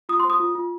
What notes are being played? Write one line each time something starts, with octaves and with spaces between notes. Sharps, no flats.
F4 D#6
C6
C5
D#6
F4
F4